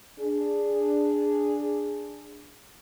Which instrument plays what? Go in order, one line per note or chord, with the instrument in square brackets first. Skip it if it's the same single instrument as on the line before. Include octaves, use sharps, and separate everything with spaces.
[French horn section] D4 G#4